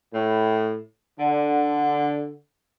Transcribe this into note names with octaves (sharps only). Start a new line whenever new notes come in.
A2
D3